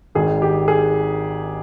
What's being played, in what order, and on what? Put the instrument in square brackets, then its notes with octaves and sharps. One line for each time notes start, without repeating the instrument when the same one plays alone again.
[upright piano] G#1 G#2 D#3 G#4
G4
G#4